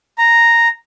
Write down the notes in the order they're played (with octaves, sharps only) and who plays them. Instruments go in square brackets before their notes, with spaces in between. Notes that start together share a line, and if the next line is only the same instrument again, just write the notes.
[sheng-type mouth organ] A#5